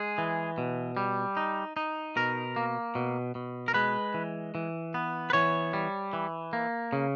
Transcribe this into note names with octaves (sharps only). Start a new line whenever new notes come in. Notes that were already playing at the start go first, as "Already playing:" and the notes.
Already playing: G#3 G#4
E3
B2
G3
D#4
D#4
B2 A#4
A#3
B2
B2
A#4
G#3 B4
E3
E3
B3
B4
E3 C#5
G3
E3
A#3
C#3